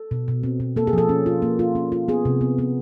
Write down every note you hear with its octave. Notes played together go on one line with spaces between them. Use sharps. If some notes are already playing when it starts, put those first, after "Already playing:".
Already playing: A4
B2
B2
C4
B2
A#3 A4
G#4
F3 A4
C#4
F4
A#3
F4
C#4
F4
B3 G#4
C3
B3
B3